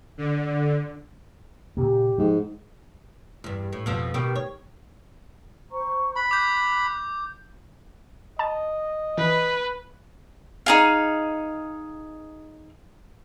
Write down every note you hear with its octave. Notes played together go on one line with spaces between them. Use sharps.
D3
A#2 C#3 A#3 G4
G#2 F3
E2 G2
A2
F2 B2 F3
B2 D#3 G4
C#5
C5 A#5 C#6
B5 F#6
D6 G6
D#5 A5
E3 B4
D#4 G#4 F5